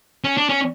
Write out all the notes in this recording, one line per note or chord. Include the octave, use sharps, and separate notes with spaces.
C#4
D4
C#4